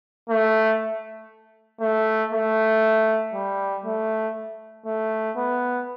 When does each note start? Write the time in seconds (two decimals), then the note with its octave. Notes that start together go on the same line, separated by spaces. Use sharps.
0.30 A3
1.81 A3
2.33 A3
3.34 G3
3.85 A3
4.86 A3
5.37 B3